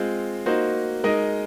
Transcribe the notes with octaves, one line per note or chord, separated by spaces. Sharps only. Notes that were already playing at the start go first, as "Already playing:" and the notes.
Already playing: G#3 C4 F4
A#3 D#4 F#4 C5
G#3 D#4 A#4 D#5